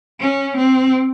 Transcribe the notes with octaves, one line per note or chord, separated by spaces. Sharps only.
C#4
C4